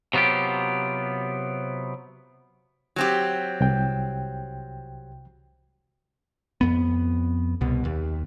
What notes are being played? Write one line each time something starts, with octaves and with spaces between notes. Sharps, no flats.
C3 F#3 B3 F4 G4
F#3 C4 G4
C2 G5
F2 B3
C2 B2
D#2